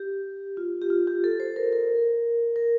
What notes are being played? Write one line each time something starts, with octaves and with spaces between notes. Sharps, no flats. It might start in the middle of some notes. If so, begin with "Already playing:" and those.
Already playing: G4
F4
G4
F4
G4
A4
C5
A#4
A#4
A#4